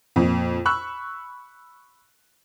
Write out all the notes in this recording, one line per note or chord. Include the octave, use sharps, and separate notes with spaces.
F2 A#2
B5 C#6 E6 F#6